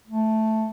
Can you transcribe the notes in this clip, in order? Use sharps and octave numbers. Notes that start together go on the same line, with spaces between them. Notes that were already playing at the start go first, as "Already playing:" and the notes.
A3